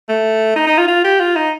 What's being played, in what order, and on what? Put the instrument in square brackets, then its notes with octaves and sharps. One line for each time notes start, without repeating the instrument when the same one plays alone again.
[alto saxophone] A3
D#4
D#4
F4
F4
G4
F4
D#4